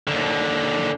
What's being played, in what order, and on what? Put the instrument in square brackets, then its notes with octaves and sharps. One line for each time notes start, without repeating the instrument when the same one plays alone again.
[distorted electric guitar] D#2 D3